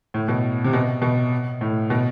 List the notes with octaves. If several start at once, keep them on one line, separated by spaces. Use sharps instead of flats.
A2
B2
C3
B2
B2
A2
B2